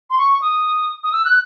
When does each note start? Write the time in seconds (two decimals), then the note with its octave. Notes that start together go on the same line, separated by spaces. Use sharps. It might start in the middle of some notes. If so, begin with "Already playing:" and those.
0.10 C6
0.18 C#6
0.42 D#6
1.04 D#6
1.12 E6
1.25 F#6